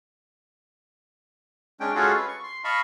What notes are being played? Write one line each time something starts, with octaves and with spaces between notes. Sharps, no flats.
G#3 C#4 D4 G5
G#3 C#4 F4 F#4 G#4 A4
B4
C#6
C6
D#5 F5 A5 B5 C#6